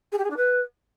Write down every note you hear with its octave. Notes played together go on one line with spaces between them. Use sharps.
G#4
G4
G#4
D4
B4